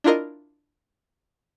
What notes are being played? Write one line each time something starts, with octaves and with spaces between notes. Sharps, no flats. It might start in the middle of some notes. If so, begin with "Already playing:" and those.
D4 E4 F4 A#4 D#5